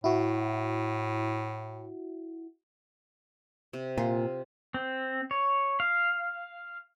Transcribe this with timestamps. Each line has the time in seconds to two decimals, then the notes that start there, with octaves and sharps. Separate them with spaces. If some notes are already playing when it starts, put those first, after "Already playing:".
0.04 A2 E4 F#4
3.73 C3
3.98 A#2 F4
4.74 C4
5.31 C#5
5.80 F5